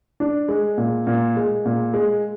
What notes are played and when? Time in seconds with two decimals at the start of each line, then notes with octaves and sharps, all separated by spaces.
0.20 D4
0.48 G#3
0.78 A#2
1.07 A#2
1.36 G#3
1.65 A#2
1.94 G#3